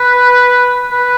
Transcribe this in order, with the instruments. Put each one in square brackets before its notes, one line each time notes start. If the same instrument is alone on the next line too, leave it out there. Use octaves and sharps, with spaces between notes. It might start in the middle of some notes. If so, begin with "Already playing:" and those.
Already playing: [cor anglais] B4
B4